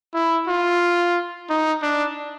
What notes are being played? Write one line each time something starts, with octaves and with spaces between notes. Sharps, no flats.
E4
F4
D#4
D4